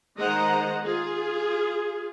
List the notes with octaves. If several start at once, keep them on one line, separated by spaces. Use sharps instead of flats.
D#3 G#3 C5 D#5 F#5 A#5
F4 G#4